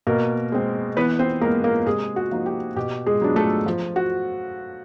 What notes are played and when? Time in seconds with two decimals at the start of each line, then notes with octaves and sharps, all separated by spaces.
0.07 B2 A#3 A#4
0.52 G#3 C4
0.97 E3 B3 B4
1.19 C4 C5
1.41 G#3 A#3 A#4
1.46 B3
1.64 A#3 A#4
1.86 C3 G#3 G#4
2.16 F#4
2.32 F3 A#3 D#4
2.46 G4
2.76 B2 G4
3.06 G#3 G#4
3.22 F#3 B3 D4
3.36 A3 A4
3.66 F3
3.96 F#4